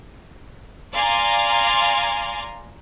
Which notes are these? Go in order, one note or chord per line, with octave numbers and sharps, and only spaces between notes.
D5 F5 G#5 A#5 C6 G#6